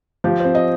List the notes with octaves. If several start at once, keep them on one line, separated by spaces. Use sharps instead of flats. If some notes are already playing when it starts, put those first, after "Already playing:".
F3 G4
C4 C5
D#5